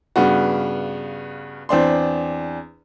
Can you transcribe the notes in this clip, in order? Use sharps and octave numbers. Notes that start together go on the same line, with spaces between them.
G2 C#3 B3 F#4
E2 C4 D4 C6